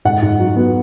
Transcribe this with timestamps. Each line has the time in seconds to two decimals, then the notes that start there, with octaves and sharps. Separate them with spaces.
0.05 G#2 F#5
0.22 G#2
0.40 F#3
0.56 B3